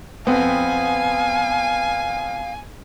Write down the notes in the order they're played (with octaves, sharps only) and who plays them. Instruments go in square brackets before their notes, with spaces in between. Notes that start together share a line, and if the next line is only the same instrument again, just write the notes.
[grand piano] F2 C4 [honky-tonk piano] B3 [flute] F5 [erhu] G#5